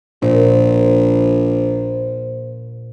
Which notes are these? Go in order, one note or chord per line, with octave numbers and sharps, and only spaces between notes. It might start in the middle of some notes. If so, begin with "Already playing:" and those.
A#1 A#2 C5